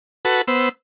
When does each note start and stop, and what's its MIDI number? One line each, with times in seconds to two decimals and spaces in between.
0.25 0.42 66
0.25 0.42 69
0.25 0.42 71
0.48 0.69 59
0.48 0.69 72
0.48 0.69 88